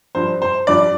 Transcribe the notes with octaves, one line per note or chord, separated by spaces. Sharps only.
G2 F3 C5
C5
G2 F3 D5